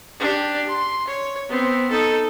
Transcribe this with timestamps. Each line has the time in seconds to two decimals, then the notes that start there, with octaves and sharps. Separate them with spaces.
0.20 D4 G4
0.68 C6
1.08 C#5
1.49 B3 C4
1.90 D#4 A4